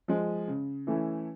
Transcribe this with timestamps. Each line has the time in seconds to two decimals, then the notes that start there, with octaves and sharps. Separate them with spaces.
0.08 F3 G#3
0.48 C#3
0.87 E3 A3 C#4 E4